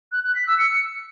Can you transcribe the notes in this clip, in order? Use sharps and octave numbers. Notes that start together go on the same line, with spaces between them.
F#6
F#6
B6
E6
C#7